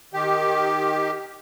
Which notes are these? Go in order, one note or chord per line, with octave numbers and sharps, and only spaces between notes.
D#3 G4